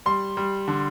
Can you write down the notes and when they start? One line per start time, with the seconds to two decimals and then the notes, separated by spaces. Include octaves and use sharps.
0.06 G3 C6
0.37 G3
0.68 D3